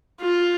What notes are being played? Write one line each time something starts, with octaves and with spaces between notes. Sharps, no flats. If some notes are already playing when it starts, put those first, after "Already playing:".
F4